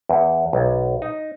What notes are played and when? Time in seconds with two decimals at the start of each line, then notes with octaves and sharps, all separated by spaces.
0.09 E2
0.53 B1
1.02 D#4